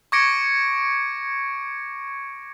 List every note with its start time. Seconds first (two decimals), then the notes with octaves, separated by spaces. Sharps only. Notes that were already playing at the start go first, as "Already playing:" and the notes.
0.12 C#6 D6 G#6 A#6 C#7 D7